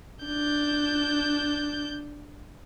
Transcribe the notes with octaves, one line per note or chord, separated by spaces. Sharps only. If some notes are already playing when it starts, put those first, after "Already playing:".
D4 G6